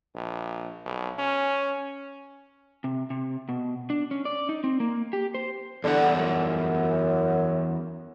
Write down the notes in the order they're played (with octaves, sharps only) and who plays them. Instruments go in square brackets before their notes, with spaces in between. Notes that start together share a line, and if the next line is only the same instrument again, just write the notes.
[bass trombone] A#1
B1
C#4
[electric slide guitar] C3
C3
B2
D4
C#4
D5
D#4
C4
A#3
G4
C5
[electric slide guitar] E2 G3 F#5 [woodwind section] D3
[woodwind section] F#2